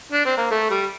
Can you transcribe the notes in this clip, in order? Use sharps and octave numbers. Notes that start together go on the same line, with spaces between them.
D4
C4
A#3
A3
G3